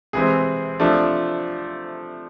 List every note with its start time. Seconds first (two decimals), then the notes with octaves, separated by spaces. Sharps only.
0.13 C3 E3 G#3 C4 G#4
0.80 C3 F3 A3 D4